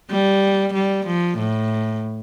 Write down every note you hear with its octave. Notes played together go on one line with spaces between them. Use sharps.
G3
G3
F3
A2